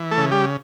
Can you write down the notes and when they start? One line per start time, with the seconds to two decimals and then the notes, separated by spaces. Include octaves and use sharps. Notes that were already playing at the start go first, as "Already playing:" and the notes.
Already playing: E3
0.11 A3 A4
0.18 C#3
0.31 G3 G4